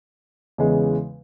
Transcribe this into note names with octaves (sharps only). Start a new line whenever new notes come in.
E2 C#3 E3 G#3